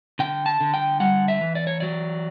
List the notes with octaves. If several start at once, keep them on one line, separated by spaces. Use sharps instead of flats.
D3 G5
A5
D3
G5
G3 F#5
E5
E3
D5
C#5
F#3 D5